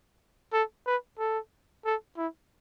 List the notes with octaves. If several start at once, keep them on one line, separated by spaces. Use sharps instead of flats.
A4
B4
A4
A4
E4